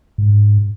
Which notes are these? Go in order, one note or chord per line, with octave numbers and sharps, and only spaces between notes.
G#2